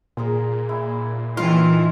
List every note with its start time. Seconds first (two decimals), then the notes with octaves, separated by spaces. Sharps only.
0.17 A#2 G#4 A#4 C5
0.69 E4
1.37 D#3 E3 C#4 D#4 F4